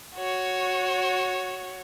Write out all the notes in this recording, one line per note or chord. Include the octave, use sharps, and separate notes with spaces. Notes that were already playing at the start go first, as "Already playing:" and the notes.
F#4 C#5